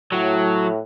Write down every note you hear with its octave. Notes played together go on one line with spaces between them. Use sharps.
A2 F#3